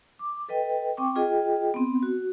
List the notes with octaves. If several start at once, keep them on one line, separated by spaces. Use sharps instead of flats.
D6
A4 B4 D#5 G5
C4 G5 C#6 D6
F4 G#4 D#5 G5
B3 C4
F#4